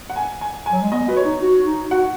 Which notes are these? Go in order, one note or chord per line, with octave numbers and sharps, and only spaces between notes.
F#5
G#5
G#5
G#5
F#3
G#3
B3 D#5
F#4 B4
C#5
D#4
F#4
D#4
F#4 F#5